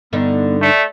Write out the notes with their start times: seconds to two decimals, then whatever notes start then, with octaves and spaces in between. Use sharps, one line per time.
0.13 G2 D3 B3 D#4
0.61 A3 D5